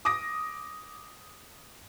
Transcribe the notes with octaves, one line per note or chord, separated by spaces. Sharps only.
D6 D#6 A#6